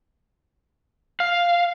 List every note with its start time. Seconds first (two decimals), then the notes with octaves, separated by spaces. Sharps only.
1.20 F5